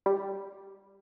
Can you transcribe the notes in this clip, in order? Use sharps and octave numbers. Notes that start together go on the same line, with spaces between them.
G3